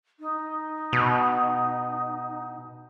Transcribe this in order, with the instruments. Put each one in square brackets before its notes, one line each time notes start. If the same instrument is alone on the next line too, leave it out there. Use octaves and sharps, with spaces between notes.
[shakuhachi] D#4
[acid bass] B2